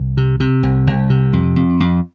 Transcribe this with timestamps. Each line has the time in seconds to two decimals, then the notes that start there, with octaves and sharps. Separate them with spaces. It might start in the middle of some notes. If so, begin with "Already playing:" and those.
Already playing: C2
0.17 C3
0.40 C3
0.63 C2
0.87 C2
1.10 C3
1.33 F2
1.56 F2
1.80 F2